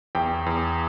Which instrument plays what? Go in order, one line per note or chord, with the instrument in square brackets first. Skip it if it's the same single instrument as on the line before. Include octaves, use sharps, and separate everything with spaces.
[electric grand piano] E2 [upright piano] G5
[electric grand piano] E2